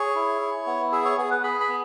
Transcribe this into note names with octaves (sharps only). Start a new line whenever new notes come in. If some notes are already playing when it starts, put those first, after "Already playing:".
Already playing: G#4 C#5
E4
E4
B3
G#4 E5
C#5
B3 G#4
B4
G#4 B5
B5
B3